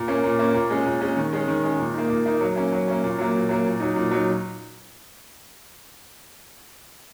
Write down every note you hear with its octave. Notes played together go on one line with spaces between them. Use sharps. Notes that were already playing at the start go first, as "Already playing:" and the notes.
Already playing: A#2
A#3 C#4
A#2
A#3 C#4
A#2
G#3 C#4
A#2
G#3 C#4
D#3
G#3 C#4
D#3
G#3 C#4
A#2
A#3 D#4
A#2
A#3 D#4
F#3
A#3 C#4
F#3
A#3 C#4
A#2
F#3 A#3
A#2
F#3 A#3
A#2
F#3 D#4
A#2
F#3 D#4